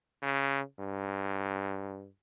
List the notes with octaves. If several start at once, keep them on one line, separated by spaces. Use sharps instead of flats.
C#3
G2